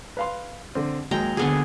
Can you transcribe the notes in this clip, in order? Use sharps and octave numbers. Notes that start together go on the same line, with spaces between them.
B4 F5 C6
D3 C4
D#2 F#3 G#3 G5 A#5
D3 B3 G#4